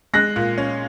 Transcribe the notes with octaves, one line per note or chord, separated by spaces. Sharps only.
G#3 F#6 A#6
A#2
C#4